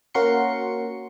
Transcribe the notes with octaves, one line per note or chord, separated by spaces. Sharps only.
A#3 C#4 F#4 A#4 C6 C#7